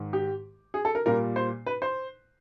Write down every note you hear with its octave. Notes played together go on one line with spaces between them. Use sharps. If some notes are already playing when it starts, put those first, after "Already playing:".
Already playing: G#2 D#3 G#3
G4
G#4
A4
A#4
A#2 G3 A#3 A#4
C5
B4
C5